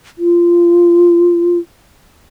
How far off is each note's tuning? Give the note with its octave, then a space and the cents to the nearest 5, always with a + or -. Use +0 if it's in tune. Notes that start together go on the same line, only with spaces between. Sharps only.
F4 -15